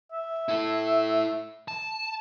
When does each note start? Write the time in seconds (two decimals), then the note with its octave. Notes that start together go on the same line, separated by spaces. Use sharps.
0.12 E5
0.49 E4 A4
1.68 A5